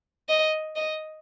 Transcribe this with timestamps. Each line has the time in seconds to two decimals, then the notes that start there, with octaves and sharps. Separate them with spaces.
0.29 D#5
0.76 D#5